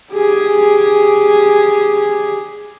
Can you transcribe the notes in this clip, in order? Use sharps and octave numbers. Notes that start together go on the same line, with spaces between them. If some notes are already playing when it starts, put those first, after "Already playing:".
G4 G#4